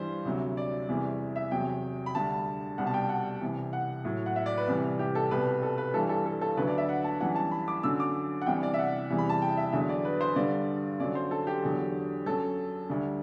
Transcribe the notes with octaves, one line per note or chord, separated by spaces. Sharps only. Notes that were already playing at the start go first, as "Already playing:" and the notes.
Already playing: G2 E3 G3 C5
D2 C3 F#3
D5
E2 C3 E3 G3
E5
E2 C3 F#3 G5
B5
D2 D3 G3 A5
C2 B2 G3 F#5
A5
G5
F#5
C2 C3 E3
F#5
A2 F#3
F#5
E5
D5
B4
C2 C3 E3 G3
G4
A4
C2 B2 G3 B4
A4
B4
G2 E3 G3 A4
A4
A4
A4
D2 D3 F#3 B4
D5
E5
F#5
A5
F#2 E3 G3 F#5
A5
B5
D6
F#2 D3 F#3 E6
D6
F#5
C2 C3 E3 G3 G5
D5
E5
F#5
E2 C3 E3 G3
B5
A5
G5
E5
E2 D3 F#3 E5
D5
B4
C5
G2 D3 G3 D5
F#2 D3 F#3 D5
C5
A4
G4
E2 D3 F#3
F#2 F#3 A4
D2 D3 G3